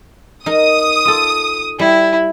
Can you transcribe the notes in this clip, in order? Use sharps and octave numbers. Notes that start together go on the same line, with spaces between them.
D#4 A#4 D#6
F4 A4
G3 E4